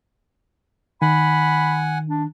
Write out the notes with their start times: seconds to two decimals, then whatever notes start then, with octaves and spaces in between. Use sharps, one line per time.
1.02 D#3 F#5 G#5 B5
2.08 D4